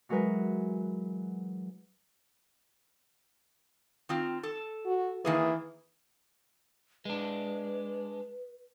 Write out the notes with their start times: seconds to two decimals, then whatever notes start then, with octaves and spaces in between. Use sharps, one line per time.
0.09 E3 F#3 G#3 A#4 B4
4.09 D#3 C4 F4
4.43 A4
4.86 F#4
5.25 D#3 E3 A#3 G#4
7.05 G#3 D4 B4